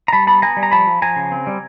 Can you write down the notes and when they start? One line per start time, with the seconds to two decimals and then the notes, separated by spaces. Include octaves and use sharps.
0.08 A#5
0.13 G3 A5 B5
0.27 B3 A5 B5
0.42 B3 G#5 A#5
0.57 G3
0.63 A#5
0.72 F3 A5 B5
0.87 F3
1.02 F3 G#5 A#5
1.16 C#3
1.32 C4
1.47 G3